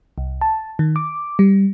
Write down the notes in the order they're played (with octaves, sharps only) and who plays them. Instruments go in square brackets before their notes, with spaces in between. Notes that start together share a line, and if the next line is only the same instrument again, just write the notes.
[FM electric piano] C2
A5
D#3
D6
G3